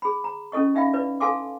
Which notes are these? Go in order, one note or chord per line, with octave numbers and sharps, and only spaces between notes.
G#4 B5
A#5
C#4 E4 A4 D#5 C#6
D#4 E5 F5 G5 B5
E4 B4 D5
A4 F5 G#5 A5 C6 D6